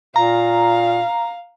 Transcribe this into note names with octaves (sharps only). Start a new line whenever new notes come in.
A#2 F5 A#5